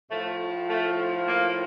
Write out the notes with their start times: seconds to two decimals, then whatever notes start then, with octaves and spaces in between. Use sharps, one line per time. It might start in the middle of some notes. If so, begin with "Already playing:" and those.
0.10 A2 F3 A3
0.69 A3
1.27 A#3